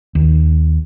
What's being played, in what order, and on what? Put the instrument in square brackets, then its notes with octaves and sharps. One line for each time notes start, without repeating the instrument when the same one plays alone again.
[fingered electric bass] D#2